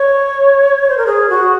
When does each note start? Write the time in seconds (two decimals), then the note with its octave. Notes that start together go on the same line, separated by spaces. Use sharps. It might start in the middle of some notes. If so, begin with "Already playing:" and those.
Already playing: C#5
0.89 C5
0.97 A#4
1.07 G#4
1.30 F#4